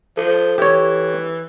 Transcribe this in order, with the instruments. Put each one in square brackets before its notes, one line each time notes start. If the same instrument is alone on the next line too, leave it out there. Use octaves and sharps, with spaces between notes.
[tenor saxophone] F3 [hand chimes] A4
[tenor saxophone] E3 [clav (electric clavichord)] G4 C#5